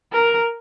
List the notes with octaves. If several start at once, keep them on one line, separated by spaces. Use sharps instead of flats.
A#4